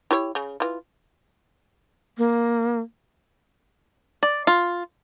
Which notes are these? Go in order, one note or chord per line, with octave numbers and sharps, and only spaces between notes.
E4 G4 C#5
C#3
E3 F4
A#3
D5
F4